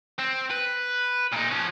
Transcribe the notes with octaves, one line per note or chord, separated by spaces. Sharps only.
C4
B4
A#2 D#4
F3 C#4